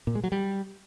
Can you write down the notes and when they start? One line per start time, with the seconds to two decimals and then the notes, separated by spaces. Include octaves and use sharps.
0.07 A#2
0.15 G#3
0.24 F#3
0.32 G3